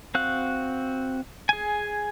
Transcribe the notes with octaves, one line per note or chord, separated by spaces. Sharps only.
C4 F#4 F5 F#6
G#4 G#5